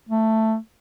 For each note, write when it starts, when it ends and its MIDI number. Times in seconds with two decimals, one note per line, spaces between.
0.09 0.56 57